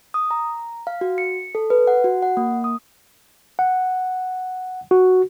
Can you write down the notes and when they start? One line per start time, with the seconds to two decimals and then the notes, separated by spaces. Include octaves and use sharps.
0.14 D#6
0.31 A#5
0.87 F5
1.01 F#4
1.18 C#7
1.55 A4
1.70 B4
1.87 F#5
2.04 F#4
2.22 F#5
2.37 A#3
2.64 D#6
3.59 F#5
4.91 F#4